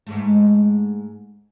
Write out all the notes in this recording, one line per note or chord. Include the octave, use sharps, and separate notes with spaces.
G#2 G#3 A3